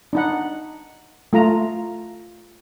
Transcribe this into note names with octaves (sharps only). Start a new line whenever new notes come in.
D4 D#4 F#5
A3 F4 A#5